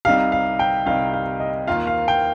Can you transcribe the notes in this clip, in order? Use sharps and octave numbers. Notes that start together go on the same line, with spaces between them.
C2 C3 G3 D#4 G4 F5
F5
G5
C2 C3 G3 D#4 F5
F5
D#5
D#2 D#3 A#3 F4 F5
F5
G5